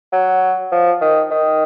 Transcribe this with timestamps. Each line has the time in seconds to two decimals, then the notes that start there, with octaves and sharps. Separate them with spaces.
0.13 F#3
0.71 F3
1.01 D#3
1.31 D#3